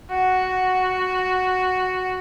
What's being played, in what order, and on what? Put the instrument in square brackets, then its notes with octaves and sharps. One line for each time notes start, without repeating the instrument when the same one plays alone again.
[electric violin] F#4 [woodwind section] F#5